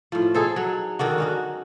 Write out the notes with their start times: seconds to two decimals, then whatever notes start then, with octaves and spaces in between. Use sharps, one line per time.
0.12 A2 F3
0.34 D#4 G#4 A4 C5
0.56 F#3
0.99 D3 D#3 D4 F#4
1.18 C#4 D#4 F#4